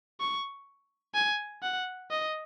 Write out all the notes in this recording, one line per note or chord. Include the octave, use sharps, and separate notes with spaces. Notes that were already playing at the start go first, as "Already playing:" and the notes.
C#6
G#5
F#5
D#5